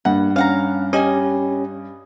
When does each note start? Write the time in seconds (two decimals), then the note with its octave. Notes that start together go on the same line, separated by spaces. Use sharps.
0.05 G2 A#3 F#5
0.36 C#4 F5 F#5 A#5
0.93 C#4 G4 D#5 G#5